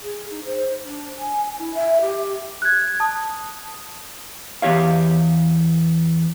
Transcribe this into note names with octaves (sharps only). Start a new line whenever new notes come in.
G#4
D#4
C5
D4
G#5
E4
E5
G4
F#6 G#6
A5 D#6
E2 G4 C#5 F5